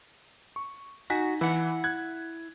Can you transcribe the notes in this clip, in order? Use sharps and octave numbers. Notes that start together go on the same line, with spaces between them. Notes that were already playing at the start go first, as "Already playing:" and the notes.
C#6
D#4 F#4 G#5 B6
E3 E4 F#5
F#6 G#6